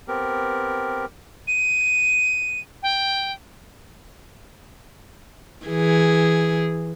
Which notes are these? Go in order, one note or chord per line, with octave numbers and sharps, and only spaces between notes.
B3 C4 G4 A#4
D#7
G5
E3 G#4